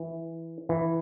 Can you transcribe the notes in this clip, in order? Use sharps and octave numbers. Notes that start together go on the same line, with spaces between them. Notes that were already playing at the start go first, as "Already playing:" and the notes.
Already playing: E3
E3